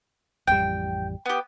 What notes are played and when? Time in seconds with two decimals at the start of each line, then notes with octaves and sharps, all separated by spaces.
0.48 A1 F2 G3 G5
1.26 B3 G4